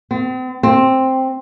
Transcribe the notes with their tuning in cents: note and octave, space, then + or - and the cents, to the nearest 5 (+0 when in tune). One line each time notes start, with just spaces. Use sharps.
C4 -40
C4 +5